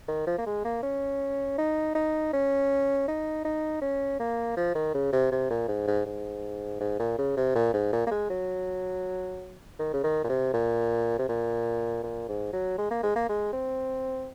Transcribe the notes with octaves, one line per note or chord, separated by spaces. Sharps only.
D#3
F3
A#3
G#3
A#3
C#4
D#4
D#4
C#4
D#4
D#4
C#4
A#3
F3
D#3
C#3
C3
C3
A#2
G#2
G#2
G#2
G#2
A#2
C#3
C3
A#2
G#2
A#2
A#3
G#3
F#3
D#3
C#3
D#3
A#2
C3
A#2
C3
A#2
A#2
G#2
F#3
G#3
A#3
G#3
A#3
G#3
C4